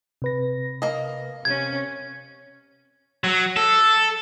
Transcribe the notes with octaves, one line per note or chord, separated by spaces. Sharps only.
C3 B4 A#6
A#3 D#5
C3 C#4 G#6
F#3
A4